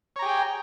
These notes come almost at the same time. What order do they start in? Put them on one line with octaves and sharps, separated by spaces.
C#5 A#5 G4 G#4 G5